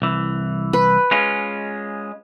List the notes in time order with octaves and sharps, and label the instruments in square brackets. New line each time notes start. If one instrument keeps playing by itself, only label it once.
[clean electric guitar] C2 E3
[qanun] B4
[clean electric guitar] G#3 C#4 F4